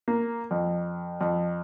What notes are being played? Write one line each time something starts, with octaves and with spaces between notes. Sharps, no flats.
A#3
F2
F2